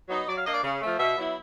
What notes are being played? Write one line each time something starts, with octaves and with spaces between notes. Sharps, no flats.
F#3 B3 D#4
F#3 D5
F5
A#3 D4 D#5
D5
C#3
F3 A3
B2 E5
F#3 B3 E4